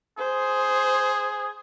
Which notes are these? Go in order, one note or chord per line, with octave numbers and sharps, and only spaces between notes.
G#4 C5